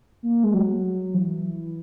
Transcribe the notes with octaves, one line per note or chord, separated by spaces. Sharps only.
A#3
G#3
F#3
E3